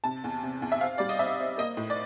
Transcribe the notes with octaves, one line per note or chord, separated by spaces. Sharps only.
C3 A5
E2
C3
E2
E5
C4 F5
G3 D5
D#5
C4 E5
C4
A#3 D#5
A2
D5